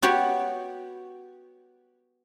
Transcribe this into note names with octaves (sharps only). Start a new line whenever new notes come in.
B3 F#4 G4 C#5